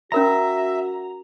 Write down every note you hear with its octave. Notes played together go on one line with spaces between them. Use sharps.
C#4 F#4 A#4 E5 A#5 B5